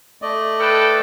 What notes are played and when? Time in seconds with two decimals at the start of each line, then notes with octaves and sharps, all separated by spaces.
0.22 A3 D5 D#5
0.59 A4 B4 G5